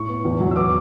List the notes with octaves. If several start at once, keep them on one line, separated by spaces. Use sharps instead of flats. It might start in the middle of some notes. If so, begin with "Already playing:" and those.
Already playing: A2 C#6
B3
E2
F#3
E6
B3 D6